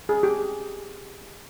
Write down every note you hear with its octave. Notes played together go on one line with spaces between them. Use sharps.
G#4
G4